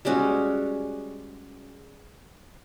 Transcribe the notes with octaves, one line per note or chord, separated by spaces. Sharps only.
G3 G#3 C#4 F#4